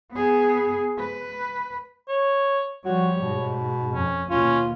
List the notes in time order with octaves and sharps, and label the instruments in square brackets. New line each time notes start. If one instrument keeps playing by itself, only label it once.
[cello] B3 G#4
B4
[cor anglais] C#5
[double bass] F3 G3 [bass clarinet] F#4 [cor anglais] C#5
[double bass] G#2 [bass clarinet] B2
[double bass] F2 [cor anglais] C#4
[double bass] D#2 B2 [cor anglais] C#4 [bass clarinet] F4